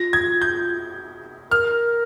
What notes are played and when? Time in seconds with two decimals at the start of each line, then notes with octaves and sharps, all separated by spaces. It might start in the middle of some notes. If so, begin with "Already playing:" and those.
Already playing: F4 A#6
0.13 G#6
0.42 G6
1.51 A#4 F6